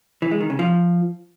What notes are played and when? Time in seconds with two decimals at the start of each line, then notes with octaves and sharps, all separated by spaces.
0.22 E3
0.31 G#3
0.41 D#3
0.50 C#3
0.59 F3